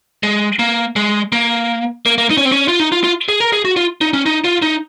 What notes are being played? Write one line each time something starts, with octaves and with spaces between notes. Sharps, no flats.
G#3
A#3
G#3
A#3
A#3
A#3
D#4
C#4
C4
C#4
F4
D#4
F4
F4
G#4
A#4
G#4
F#4
F4
D#4
C#4
D#4
F4
D#4